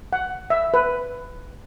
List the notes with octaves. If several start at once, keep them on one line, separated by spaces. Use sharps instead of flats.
F#5
E5
B4